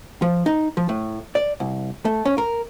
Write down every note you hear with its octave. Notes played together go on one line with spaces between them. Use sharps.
F3
D#4
F3
A2
D5
C2
A3
C#4
A#4